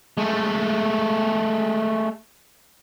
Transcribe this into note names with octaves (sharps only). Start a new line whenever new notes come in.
G#3 A3